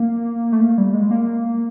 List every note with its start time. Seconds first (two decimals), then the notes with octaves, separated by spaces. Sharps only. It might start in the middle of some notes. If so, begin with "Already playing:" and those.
Already playing: A#3
0.52 A3
0.61 A#3
0.78 G3
0.94 G#3
1.11 A#3